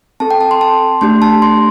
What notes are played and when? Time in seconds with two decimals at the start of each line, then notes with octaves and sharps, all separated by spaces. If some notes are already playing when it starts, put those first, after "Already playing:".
0.20 C4 A4 A5
0.31 G5
0.41 A5
0.51 C6
0.61 A5
1.01 A3 D4 G4 C6
1.22 A5
1.42 C6